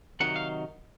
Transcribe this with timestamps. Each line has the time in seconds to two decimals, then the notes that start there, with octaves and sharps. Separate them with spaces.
0.20 C3 D#3 F#3 D#4 F#5
0.36 F5